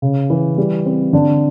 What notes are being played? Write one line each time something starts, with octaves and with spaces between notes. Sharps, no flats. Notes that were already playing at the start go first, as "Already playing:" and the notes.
C#3
E3
G3
C4
D3